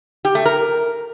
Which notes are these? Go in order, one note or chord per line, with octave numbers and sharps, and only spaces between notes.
G4
A3
A#4